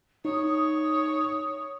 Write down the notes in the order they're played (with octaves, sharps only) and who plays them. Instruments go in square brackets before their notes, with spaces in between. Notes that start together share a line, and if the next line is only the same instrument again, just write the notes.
[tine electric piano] D#4 [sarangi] C#5 [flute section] D#6